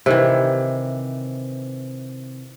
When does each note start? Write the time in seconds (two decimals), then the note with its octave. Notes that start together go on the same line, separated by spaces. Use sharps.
0.06 C3 D#3 E3